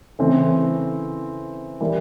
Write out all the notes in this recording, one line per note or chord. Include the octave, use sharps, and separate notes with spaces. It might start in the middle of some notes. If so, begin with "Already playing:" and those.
C#3 E3 A3 C4 E4
E3 G3 A#3